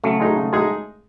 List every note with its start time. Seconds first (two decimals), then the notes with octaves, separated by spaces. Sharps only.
0.04 C#3 F#3 A3
0.20 G#3 D#4 G#4
0.36 C#3
0.53 G#3 D#4 G#4